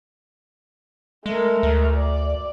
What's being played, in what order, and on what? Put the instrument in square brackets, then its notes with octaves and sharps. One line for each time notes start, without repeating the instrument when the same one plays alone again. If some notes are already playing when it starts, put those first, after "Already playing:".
[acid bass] G#3 [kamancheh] A3 A#4
[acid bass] D2
[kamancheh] D5